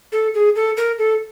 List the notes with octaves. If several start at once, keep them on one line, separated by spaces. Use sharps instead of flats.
A4
G#4
A4
A#4
A4